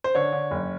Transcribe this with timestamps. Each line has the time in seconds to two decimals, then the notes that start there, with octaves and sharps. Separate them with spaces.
0.04 C5
0.15 D3 C#5
0.32 D3
0.51 F#1